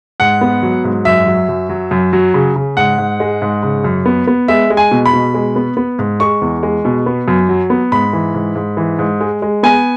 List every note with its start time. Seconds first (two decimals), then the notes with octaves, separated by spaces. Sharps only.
0.20 G#2 F#5
0.41 B3
0.63 F#3
0.84 G#2
1.05 F#2 E5
1.27 F#3
1.49 F#2
1.69 F#3
1.91 F#2
2.13 F#3
2.34 C#3
2.56 C#3
2.77 G#2 F#5
2.98 G#2
3.20 G#3
3.42 G#2
3.63 C#3
3.84 F#2
4.06 B3
4.27 B3
4.48 G#3 E5
4.70 G#3
4.77 G#5
4.91 B2
5.06 B5
5.13 B2
5.34 G#3
5.56 B3
5.77 B3
5.99 G#2
6.20 G#3 C#6
6.42 E2
6.63 G#3
6.85 B2
7.06 B3
7.28 F#2
7.49 F#3
7.70 B3
7.92 G#2 B5
8.13 E3
8.35 G#2
8.56 G#2
8.77 E3
8.99 G#2
9.21 G#3
9.42 G#3
9.63 B3 G#5